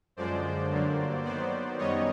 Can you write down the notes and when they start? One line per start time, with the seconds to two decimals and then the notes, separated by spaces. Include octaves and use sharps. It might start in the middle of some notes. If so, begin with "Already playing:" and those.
0.17 F#2 D3 F3 G#3 C5 D5
0.71 G2 D3 F#3 A#3
1.24 D#3 F#3 B3 C5 D5
1.78 F#2 D#3 G3 B3 D#4 C#5 D#5